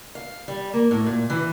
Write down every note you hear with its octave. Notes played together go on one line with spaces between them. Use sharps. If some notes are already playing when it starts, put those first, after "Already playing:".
F5
G3
A#3
A2
A#2
E3